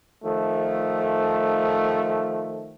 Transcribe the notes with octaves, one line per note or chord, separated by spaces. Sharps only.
D#3 F3 A3